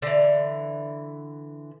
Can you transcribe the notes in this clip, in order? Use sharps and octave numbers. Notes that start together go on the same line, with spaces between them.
D3 E3